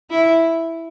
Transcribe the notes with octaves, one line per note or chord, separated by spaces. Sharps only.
E4